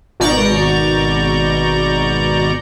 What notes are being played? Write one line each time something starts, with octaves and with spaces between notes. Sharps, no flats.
G#1 B2 D5 A#5 C#6 G6